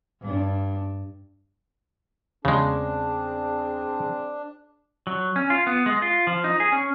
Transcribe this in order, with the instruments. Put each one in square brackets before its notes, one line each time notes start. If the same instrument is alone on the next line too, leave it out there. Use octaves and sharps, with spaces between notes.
[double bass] G2 D4
[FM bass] E2 [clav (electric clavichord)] C#3 G#3 [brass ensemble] C4 G#4 [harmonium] D4
[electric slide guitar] F#3
C#4
F4
B3
G#3
F4
F3
D#4
G#4
C#4